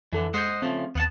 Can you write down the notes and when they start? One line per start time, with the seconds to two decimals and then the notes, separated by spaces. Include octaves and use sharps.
0.13 F2 D3 E3 A4
0.34 G#3 C5 D#5 F#5 G6
0.62 C#3 F3 A3 C4
0.95 D#2 B3 F#5 A5